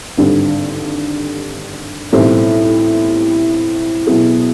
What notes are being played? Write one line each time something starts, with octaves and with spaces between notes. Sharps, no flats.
G#1 G2 D3 G3 C4
B1 A2 E3 G3 C4
B2 F#3 B3 E4 G#4